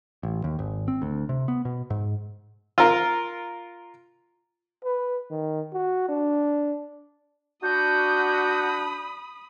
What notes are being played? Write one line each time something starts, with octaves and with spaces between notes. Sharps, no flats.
A1
D#2
G#1
C4
D2
C3
B3
B2
G#2
F4 A#4
B4
D#3
F#4
D4
D4 F#4 B5 D#6 G6